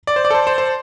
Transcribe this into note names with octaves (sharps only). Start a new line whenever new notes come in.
D5
C5
D5
A4
C5
C5
C5